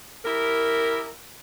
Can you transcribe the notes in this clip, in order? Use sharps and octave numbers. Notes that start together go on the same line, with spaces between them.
E4 G4 A#4